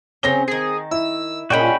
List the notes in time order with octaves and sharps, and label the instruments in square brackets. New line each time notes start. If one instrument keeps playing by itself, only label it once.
[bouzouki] C#3 F#3 C#4 [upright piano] C4 A#6 G7
[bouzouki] D#3 A5 [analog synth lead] G#4
[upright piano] E4 [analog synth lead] E6
[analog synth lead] A#2 [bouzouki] G3 G#3 C#4 [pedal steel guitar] F#4 G5 B5